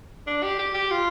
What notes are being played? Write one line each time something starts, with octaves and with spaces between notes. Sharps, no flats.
D4
G4
G4
G4
F4